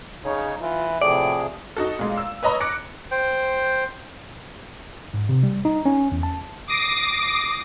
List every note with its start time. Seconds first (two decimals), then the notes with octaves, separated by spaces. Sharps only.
0.25 C#3 D#4 C#5
0.62 E3 F4
1.02 A2 C3 F3 G#4 D5
1.77 D#4 F#4 A4
1.99 A#2 G#3
2.17 E6
2.43 B4 C#5 D#5 A#5 B5
2.60 D6 F#6 A#6 C#7 D7
3.11 C5 G5
5.14 G#2
5.29 C3
5.43 G3
5.65 D#4
5.86 C#4
6.12 E2
6.23 A5
6.67 D6 D#6 A#6 C7 D7